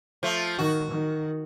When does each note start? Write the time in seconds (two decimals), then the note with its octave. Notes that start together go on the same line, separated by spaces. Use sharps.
0.23 F3 A3
0.58 D#3 F#4
0.92 D#3